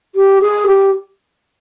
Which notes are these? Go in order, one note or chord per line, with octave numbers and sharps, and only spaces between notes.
G4
G#4
G4